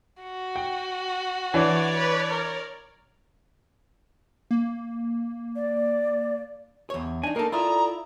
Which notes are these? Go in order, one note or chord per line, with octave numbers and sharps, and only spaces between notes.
F#4
G5
E3 D4 C#5 D5
B4
A#4
A#3
D5
E2 C#5
D4 D#4 G#5
A#3 D#4 A4 A#4
E4 F4 A4 D5 A#5 D#6